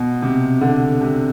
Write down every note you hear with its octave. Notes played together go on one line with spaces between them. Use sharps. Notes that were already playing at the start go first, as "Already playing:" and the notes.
Already playing: B2
C3
D3
C3